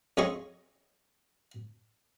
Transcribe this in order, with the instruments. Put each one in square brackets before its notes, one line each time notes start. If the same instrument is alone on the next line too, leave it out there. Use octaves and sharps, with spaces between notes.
[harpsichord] F2 C#4 G#4 D#5 C#6